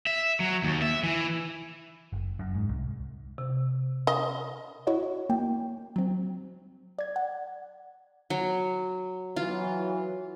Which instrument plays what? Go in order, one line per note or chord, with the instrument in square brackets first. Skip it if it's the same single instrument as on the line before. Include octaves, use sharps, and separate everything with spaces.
[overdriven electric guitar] E5
F#3
D#2
E5
E3
[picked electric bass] F#1
F#2
G#2
C2
[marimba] C3
[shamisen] D#5
[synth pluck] E4 F#4 C#5 D#5
A#3 G5
F#3 C4
D5 G#6
F#5
[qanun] F#3
[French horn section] E3 F#3 [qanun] F4